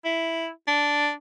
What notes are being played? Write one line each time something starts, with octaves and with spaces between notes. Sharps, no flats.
E4
D4